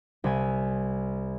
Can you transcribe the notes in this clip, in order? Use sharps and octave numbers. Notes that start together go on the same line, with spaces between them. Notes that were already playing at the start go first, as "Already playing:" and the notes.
C2 G#5